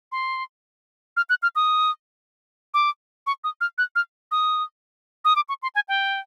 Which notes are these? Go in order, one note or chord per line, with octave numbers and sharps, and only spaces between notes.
C6
F6
F#6
F6
D#6
D6
C#6
D#6
F6
F#6
F6
D#6
D#6
D6
C#6
C6
G#5
G5